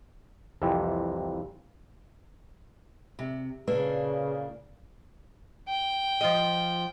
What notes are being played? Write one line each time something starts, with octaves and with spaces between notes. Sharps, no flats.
C2 F2 C3 E3
C3
A#2 C#3 A#3 D4 B4
G5
F3 F4 D#5